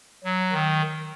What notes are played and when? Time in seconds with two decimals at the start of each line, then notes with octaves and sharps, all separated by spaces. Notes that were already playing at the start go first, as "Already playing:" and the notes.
0.24 F#3
0.53 D#3